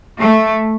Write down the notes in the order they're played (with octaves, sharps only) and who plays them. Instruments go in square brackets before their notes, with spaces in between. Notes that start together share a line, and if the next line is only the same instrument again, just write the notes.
[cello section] A3